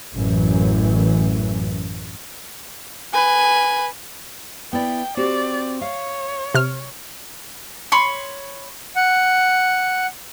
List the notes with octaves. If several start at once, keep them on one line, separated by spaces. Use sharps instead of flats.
A1 F#2 E3
B4 G#5
B3 E4 D5 G5
C4 F#4 G4 D5
C#5 F5
C3 F6
C#5 B5 C6
F#5